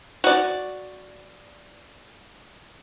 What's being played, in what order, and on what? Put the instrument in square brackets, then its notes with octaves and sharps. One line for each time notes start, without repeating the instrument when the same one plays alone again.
[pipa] F#4 D5